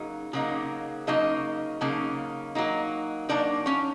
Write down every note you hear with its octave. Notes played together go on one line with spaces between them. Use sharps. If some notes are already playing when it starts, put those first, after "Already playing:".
Already playing: C#3 F#3 A#3 D#4
C#3 F#3 A#3 D#4
C#3 F#3 A#3 D#4 D#5
C#3 F#3 A#3 D#4
F#3 A#3 D#4
F#3 A#3 D4 D#4 D5
C#4 C#5